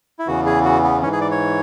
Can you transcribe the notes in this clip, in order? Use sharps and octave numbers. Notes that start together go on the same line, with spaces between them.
E4
E2 C#3 E3 F#4
G#4
F#4
B3
G#2 E3 C#4
G#4
D5
C#5